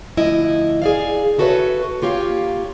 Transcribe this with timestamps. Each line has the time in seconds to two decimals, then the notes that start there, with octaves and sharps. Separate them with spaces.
0.17 D2 F3 E4 D#5
0.82 G#4 D5 F5
1.39 E4 F#4 A4 B4 C#5 E5
2.02 A#3 F4 G4 C#5 F5